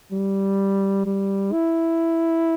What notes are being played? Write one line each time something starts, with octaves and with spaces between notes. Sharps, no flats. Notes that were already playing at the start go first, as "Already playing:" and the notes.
G3
G3
E4